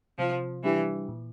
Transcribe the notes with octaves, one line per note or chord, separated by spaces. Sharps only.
C3 F3
E3 G3 D4 G4
A#2